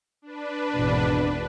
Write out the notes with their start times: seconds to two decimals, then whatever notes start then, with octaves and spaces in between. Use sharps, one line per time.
0.22 D4 B4
0.73 G#1 E2 B2